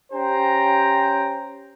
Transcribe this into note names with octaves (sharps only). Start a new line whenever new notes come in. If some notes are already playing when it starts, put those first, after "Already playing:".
C#4 G4 C5 G5 A#5